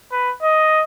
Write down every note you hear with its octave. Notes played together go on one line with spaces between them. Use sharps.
B4
D#5